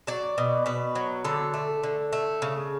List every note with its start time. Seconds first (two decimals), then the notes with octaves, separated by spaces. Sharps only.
0.07 F#3 D5
0.38 B2
0.66 B2 B4
0.95 F#3
1.24 D3 A4
1.54 A3
1.83 D3
2.13 A3
2.42 C#3